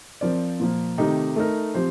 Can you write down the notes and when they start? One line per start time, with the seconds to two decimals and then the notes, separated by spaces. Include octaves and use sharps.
0.21 F3 C4 F4 A#4 D5
0.60 A#2 F3 A#3
0.98 C3 D#3 A3 D#4 G4
1.36 A3 D#4 A#4
1.75 F3 C4 G4 C5